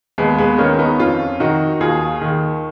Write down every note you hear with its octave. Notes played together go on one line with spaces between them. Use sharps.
D#2 G#3 B3
G#3 B3
D#3 A#3 C#4
B3 D#4
F2 C#4 F4
D#3 D#4 F#4
D#2 F4 G#4
D#3